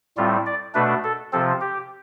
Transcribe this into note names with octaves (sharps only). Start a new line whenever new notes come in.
A2 G3 C4 F4
D5
B2 A3 D4 B4
A4
C3 F3 C4 A4
G4